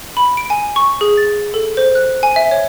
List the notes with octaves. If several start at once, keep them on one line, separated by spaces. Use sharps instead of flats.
B5
D7
G#5
C#6
G#4
A6
A4
C5
F#6
G#5
E5
C#5